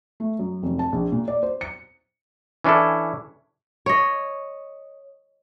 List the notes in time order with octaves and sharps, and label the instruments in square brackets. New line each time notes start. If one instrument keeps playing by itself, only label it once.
[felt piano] A3
F#2
F1
A5
A#1
A#2
D5
C5
C#7
[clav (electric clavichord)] E3 C#4 D4 E4 A4
[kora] C#5 D#5